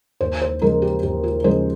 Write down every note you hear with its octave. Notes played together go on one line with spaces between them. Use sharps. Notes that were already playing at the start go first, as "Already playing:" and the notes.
D#2 C5
C5
C#3 F3 G#3 A#4
G4
D#2 G4
F4
C#3 F3 G#3 C5